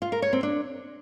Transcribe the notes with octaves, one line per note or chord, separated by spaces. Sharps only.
F4
A#4
C#5
C4
D4